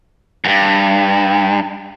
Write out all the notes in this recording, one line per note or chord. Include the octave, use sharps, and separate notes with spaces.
E2 G2